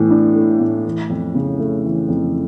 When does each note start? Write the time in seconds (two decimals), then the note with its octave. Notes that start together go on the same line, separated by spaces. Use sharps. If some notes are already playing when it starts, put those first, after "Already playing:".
Already playing: A2 E3 A3
0.11 D4
0.35 A3
0.60 A2
0.85 E3
1.10 F2
1.35 C#3
1.59 A3
1.84 E3
2.09 F2